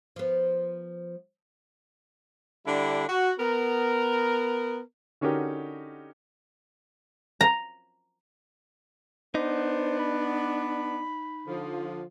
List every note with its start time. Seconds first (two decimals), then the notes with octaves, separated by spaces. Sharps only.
0.16 F3 B3
2.66 D3 G3 D4 E4
3.08 F#4
3.39 B3 A#4
5.21 D3 C#4 D#4 F#4 G4 A#4
7.41 A#5
9.35 B3 D4 D#4 C5
9.99 B5
11.47 D3 F3